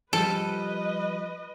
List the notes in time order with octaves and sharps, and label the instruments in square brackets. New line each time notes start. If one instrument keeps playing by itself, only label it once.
[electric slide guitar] F3 G3 [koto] A4 [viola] B4 D#5